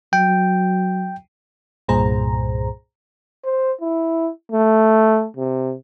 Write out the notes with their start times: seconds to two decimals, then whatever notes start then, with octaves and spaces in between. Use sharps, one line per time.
0.13 F#3 G5
1.88 C2 G2 A#2 G#4 C5 A#5
3.44 C5
3.81 E4
4.51 A3
5.37 C3